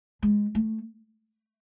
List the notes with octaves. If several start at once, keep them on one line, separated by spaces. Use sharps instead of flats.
G#3
A3